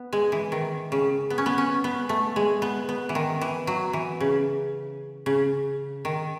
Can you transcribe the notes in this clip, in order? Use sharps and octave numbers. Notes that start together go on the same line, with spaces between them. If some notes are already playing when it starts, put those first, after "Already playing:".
Already playing: B3
G#3
E3
D#3
C#3
B3
C#4
B3
C#4
B3
A3
G#3
B3
B3
E3
D#3
E3
F#3
E3
C#3
C#3
D#3